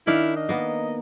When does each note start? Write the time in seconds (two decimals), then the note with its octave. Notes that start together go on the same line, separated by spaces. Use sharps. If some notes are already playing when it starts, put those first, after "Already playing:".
0.07 D#3 D4 E4 F5
0.36 D#5
0.49 A#3 B3